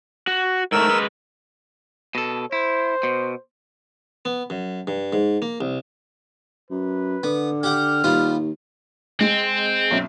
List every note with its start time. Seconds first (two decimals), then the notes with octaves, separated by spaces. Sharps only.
0.27 F#4
0.72 G#2 A3 A#4 E6
0.90 G#3 B4
2.15 B2 A4
2.52 E4 C5
3.03 B2
4.25 B3
4.50 F#2
4.87 G2
5.13 G#2
5.42 A#3
5.61 C2
6.71 F#2 B4
7.23 D3 B3
7.63 G4 F#5 G5 F6
8.04 D#2 G3 B3 F4
9.20 G#3 C4
9.91 B1 F#2 E5